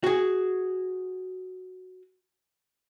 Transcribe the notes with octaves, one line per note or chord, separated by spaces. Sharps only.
F#4 G#4